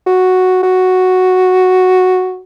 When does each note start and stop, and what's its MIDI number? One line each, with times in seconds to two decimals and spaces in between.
0.07 0.61 66
0.63 2.41 66